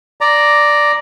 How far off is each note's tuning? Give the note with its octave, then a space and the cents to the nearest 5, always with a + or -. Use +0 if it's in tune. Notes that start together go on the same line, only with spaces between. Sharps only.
D5 +0 A#5 +0